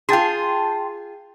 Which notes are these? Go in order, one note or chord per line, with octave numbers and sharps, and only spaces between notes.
F4 G#4 G5 A5 C6